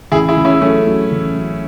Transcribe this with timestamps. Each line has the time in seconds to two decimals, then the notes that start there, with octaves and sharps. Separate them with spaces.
0.12 A1 E4 G#4
0.28 E4 G#4
0.37 A1
0.45 C#4 E4
0.61 F#3 A3 C#4
0.87 F#3
1.11 A1
1.36 F#3